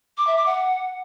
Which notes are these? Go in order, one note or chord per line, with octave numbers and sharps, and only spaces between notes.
D6
E5
D6
F#5